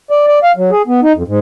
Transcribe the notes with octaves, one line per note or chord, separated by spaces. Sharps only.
D5
D5
F5
F#3
G#4
B3
D#4
F2
G#2